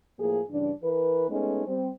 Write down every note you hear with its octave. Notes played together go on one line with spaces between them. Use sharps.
A2 F3 A#3 G#4
G2 C#3 E3 D4
E3 A#4 B4
G#3 A3 B3 C#4 D#4
G3 C4